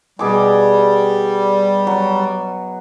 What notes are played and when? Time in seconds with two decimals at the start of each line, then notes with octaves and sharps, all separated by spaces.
0.19 B2 G3 G#4 D6
1.87 F#3